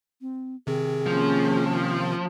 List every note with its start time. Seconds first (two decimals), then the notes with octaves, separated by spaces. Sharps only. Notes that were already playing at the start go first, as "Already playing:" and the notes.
0.21 C4
0.67 C3 D#3 C4 G#4
1.06 F3 A#3 C#4